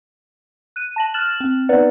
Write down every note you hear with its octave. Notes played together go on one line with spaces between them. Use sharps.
F#6 D#7
A5 A#6 F#7
F6 F#6 A6 E7 F#7
C4
B3 D#4 B4 D5 F#5